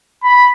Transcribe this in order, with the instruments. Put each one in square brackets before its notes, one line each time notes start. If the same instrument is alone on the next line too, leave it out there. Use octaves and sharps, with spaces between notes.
[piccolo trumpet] B5